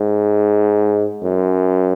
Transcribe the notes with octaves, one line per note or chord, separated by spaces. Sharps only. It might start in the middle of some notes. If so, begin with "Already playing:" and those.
Already playing: G#2
F#2